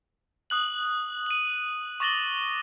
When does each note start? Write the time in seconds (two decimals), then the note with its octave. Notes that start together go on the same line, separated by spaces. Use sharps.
0.50 D#6 F#6 F#7
1.26 D#7 F#7
2.00 C#6 D6 A6 A#6 F#7 G7